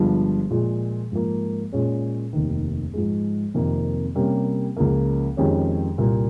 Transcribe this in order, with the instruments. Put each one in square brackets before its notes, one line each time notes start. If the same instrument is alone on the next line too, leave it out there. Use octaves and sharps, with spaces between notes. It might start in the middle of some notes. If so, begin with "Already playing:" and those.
Already playing: [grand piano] G1 G2 F3 G#3
A#2 F3 G#3
G#2 F3 A#3
A#2 G#3 C#4
F1 D#2 D#3
G#2 F3 G#3
F2 C3 D#3 A#3
C3 G3 A#3 C#4 G4
C#2 C#3 F3 A#3
F2 D#3 G#3 C#4 G4
C2 A#2 G3 A#3